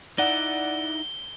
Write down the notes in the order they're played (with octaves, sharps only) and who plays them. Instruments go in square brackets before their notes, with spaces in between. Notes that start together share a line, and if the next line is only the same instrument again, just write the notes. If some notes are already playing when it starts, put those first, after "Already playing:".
[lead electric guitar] D#4 E4 [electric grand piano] D5 F#5 [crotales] G7